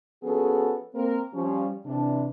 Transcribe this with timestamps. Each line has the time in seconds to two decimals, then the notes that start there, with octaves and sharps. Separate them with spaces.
0.23 F3 B3 C#4 F#4 G#4 A4
0.94 A#3 C4 A#4
1.33 F3 G3 C#4
1.86 C3 E3 D4